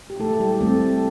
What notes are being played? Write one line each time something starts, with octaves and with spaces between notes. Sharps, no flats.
G4
A3 E4 A4
A4
G3 G4
A3 C4 A4